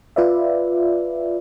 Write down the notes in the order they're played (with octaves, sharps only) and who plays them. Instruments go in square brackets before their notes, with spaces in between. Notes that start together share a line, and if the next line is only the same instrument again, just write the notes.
[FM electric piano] F4 B4 D5 E5